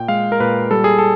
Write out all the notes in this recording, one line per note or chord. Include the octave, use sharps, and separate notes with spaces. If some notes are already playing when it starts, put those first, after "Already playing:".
Already playing: A#2 G5
G#3 F5
A#4
A#2 B4
G3 A4
G#4
A4